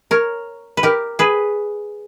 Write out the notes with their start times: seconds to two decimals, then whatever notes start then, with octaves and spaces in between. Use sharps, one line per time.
0.11 A#4 C#5
0.77 B4
0.83 G4 A#4
1.19 G#4 B4